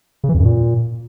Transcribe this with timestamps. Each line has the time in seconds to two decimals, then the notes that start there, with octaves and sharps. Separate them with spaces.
0.24 C#3
0.29 E3
0.34 F2
0.40 F#2
0.45 A#2